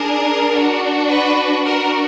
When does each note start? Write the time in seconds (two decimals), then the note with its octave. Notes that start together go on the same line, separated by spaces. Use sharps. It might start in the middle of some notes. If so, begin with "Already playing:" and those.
Already playing: D4 G#4 A#4
0.50 D4 F#4
1.08 B4
1.65 D4 F#4 A#4